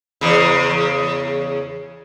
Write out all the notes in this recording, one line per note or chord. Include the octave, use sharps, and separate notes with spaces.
E2 C#3